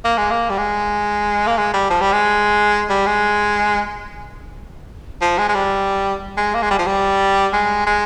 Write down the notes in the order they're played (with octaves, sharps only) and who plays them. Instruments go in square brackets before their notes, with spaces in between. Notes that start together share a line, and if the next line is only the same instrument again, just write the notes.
[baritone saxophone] A#3
G#3
A#3
G3
G#3
A#3
G#3
G3
F3
G3
G#3
G3
G#3
F3
G#3
G#3
G3
G#3
A#3
G#3
G3
F3
G3
G#3
G#3